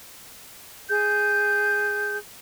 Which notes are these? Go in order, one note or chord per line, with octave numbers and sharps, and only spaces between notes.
G#4 G6